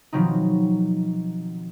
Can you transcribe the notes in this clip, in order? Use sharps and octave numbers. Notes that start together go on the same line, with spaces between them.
B2 D#3 F3 F#3 C4 D#4